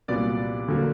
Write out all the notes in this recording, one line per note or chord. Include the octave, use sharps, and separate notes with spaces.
C2 A#2 F#3 B3 D5
D2 D3 F#3 A#3